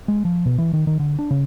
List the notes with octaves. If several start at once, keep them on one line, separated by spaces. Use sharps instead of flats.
G#3
F3
B2
E3
D#3
D#3
D3
D4
C#3